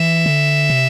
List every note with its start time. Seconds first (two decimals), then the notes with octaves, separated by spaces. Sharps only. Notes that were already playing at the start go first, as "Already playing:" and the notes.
Already playing: E3 E5
0.26 D3
0.70 C3